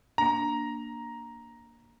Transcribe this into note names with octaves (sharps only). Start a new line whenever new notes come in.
A#3 D4 A#5